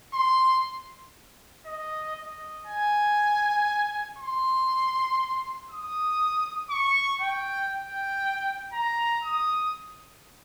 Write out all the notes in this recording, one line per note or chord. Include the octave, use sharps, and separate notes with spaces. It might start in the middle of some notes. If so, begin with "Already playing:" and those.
C6
D#5
D#5
G#5
C6
D#6
C#6
G5
G5
A#5
D#6